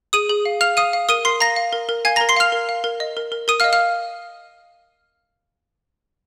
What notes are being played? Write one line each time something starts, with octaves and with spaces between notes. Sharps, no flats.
G#4 D#6 D#7
G#4
F5
F5 F6 F7
F5 D#6 D#7
F5
A#4 D#6 D#7
A#4 C6 C7
F5 A#5 A#6
F5
A#4
A#4
F5 G#5 G#6
A#4 A#5 A#6
C6 C7
F5 F6 F7
A#4
F5
A#4
D#5
A#4
A#4
A#4 D#6 D#7
F5 F6
D#5
F5 F6